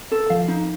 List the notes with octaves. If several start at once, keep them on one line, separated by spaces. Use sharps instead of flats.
A4
F3 F5
D#4